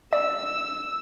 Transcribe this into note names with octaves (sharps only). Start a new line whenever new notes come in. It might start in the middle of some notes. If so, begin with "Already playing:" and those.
D5 E6